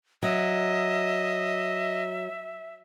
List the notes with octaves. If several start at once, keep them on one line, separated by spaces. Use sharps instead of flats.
F#3 D#5 E5